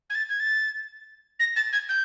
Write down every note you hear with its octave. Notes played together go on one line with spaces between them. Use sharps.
G#6
A6
G#6
A6
A#6
A6
G#6
G6